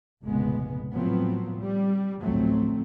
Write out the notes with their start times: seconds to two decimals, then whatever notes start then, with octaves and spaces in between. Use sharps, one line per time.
0.23 F1 A#1 A#2 C#3 G#3 B3
0.94 A2 F3 F#3 B3 C4
1.58 G3
2.23 A1 D2 F3 F#3 A3 C4